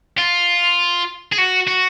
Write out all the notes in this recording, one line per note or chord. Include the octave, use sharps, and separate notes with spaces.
F4
G#4
F#4
F#4